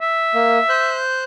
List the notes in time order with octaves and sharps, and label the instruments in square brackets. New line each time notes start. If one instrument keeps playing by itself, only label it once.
[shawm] E5
[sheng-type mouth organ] A#3
C5 F#6 G6